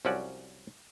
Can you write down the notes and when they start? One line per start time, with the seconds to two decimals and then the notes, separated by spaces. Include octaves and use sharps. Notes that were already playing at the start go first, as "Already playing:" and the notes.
0.05 C2 F3 F#3 C#4 F#4 D5